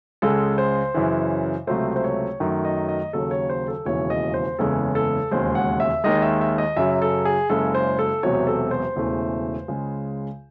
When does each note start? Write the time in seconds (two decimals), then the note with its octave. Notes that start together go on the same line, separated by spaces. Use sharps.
0.22 C#2 C#3 G#3 A4
0.58 C5
0.94 F#2 C#3 E3
1.67 C#2 C3 F#3 A3 C5
1.96 C5
2.04 C#5
2.40 F#2 D#3 F#3 A3
2.65 D#5
2.88 D#5
3.13 D#2 C#3 F#3 A4
3.31 C#5
3.49 C5
3.68 A4
3.85 E1 D#2 C#3 E3 C#5
4.10 D#5
4.34 C5
4.59 F#1 E2 C#3 G#3 A4
4.95 A4
5.31 E1 D#2 C#3 G#3 C5
5.55 F#5
5.80 E5
6.04 D#2 D#3 G#3 D#5
6.22 E5
6.41 E5
6.58 D#5
6.76 F#2 C#3 F#3 E5
7.02 A4
7.25 G#4
7.50 F#1 F#2 C#3 G#3 A4
7.75 C5
7.99 A4
8.23 E1 E2 C3 F#3 C#5
8.47 A4
8.71 C5
8.96 E1 E2 C#3 E3 A3
9.68 C#2 C#3 G#3